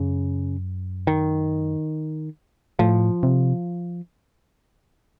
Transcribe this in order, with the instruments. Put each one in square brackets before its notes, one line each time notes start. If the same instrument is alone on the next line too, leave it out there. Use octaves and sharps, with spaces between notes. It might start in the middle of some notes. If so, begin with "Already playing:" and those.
Already playing: [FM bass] F#2 [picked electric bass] C#3
[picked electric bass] D#3
[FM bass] A2 [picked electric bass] F3
[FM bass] C3